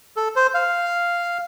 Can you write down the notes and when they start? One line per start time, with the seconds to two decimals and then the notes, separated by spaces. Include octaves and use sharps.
0.17 A4
0.36 C5
0.54 F5